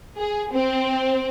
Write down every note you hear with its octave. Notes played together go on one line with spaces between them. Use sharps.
G#4
C4